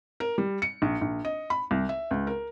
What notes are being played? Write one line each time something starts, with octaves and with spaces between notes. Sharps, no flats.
A#4
G3
C#7
A#1
A#1
D#5
B5
C2
E5
C#2
A#4